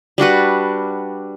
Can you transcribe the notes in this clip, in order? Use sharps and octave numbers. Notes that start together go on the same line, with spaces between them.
G3 D4 F#4 B4